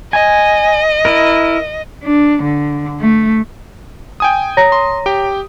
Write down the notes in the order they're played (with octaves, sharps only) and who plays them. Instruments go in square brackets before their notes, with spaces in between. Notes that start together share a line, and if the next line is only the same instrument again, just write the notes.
[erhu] D#5 [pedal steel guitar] G#5
[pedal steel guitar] E4 A#4
[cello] D4
D3
A3
[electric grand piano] G5 G#5 D#6
[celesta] C#5 A#5 A#6
[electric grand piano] C6
G4 G5